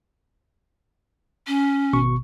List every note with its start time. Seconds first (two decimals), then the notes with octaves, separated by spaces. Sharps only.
1.47 C#4
1.93 G#1 B2 C#6